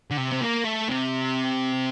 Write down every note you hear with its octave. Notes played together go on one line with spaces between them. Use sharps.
D3
C3
C4
A#3
A3
C3